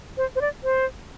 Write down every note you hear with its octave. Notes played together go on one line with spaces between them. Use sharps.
C5
C5
D5
C5